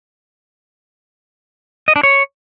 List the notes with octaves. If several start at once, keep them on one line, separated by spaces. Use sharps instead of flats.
D#5
D4
C#5